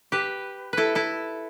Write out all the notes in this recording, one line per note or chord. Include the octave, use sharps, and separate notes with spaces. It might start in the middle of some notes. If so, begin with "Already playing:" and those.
G4 B4
E4 A4 B4
E4 A4